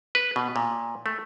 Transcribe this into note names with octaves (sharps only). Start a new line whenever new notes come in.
B4
B2
A#2
A3